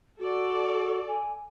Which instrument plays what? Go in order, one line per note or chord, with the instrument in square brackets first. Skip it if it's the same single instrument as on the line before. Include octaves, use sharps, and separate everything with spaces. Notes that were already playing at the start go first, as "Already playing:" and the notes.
[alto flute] F#4 [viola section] A4 D5
[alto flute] G#5